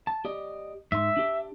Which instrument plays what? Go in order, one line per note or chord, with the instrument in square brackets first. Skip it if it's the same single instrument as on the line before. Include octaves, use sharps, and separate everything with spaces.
[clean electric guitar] A5
G4 D5 D#5
[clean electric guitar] G#2 C6 [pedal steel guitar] E5
[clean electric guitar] D4 G4